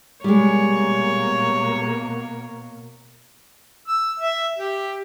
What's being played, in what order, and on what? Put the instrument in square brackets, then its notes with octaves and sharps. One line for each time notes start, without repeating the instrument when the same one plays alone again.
[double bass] B2 A#3 [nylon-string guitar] G3 G#3 [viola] C#5
[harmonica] E6
E5
G4